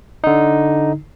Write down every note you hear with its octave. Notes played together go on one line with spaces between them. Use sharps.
D3 D#4